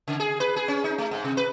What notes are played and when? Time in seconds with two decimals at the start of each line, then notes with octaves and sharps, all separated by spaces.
0.08 C#3
0.20 G#4
0.40 B4
0.56 G#4
0.68 C#4
0.84 D#4
0.98 A3
1.11 G#2
1.24 C3
1.37 B4